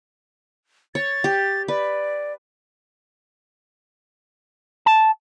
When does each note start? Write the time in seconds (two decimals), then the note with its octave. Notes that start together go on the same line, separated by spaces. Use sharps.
0.95 C#5 A6
1.24 G4
1.68 B4 D5
4.86 A5